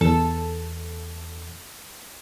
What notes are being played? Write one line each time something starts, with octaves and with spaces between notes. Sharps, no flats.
E2 A4